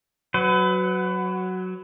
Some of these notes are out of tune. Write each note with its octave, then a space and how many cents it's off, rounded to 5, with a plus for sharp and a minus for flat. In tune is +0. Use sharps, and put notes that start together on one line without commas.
F#3 +0 B4 +25